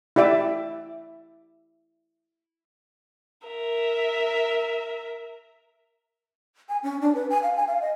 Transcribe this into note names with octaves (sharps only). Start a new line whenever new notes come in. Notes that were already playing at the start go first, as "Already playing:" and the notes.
E4 G4 D5 E5 D6
A#4 E5
G#5
C#4
D4
B4
G#5
F5
G#5
F5
D#5